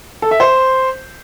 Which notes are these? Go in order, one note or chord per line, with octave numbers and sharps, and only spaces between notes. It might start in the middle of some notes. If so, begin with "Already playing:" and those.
A4
E5
C5